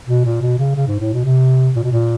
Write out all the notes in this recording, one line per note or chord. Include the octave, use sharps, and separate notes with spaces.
B2
A#2
B2
C#3
C#3
G#2
A2
B2
C3
A#2
B2
A#2